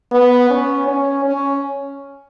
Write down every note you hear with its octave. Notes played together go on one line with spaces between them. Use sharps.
B3
C#4
C#4
C#4